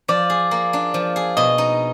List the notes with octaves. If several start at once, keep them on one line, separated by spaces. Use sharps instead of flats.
F3 D5
G#4
A#3
D4
F3
G#4
B2 D#5
D#4